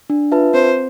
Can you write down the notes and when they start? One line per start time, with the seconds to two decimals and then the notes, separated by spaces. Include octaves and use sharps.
0.10 D4
0.32 F4 B4 E5 A5
0.54 C4 C5